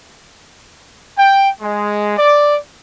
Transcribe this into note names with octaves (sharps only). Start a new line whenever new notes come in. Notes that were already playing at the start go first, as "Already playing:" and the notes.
G5
G#3
D5